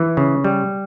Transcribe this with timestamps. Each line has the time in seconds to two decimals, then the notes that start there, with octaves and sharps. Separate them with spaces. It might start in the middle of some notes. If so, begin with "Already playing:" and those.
Already playing: E3
0.17 C#3
0.44 G3